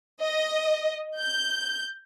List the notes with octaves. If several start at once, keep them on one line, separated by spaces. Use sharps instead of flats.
D#5
G6